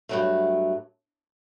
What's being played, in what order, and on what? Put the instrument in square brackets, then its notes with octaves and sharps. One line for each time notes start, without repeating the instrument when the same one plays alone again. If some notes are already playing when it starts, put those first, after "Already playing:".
[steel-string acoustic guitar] G2 F#3 A3